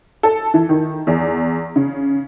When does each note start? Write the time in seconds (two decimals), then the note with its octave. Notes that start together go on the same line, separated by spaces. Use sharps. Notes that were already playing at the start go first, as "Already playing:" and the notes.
0.23 A4
0.54 E3
0.69 D#3
1.07 E2
1.76 C#3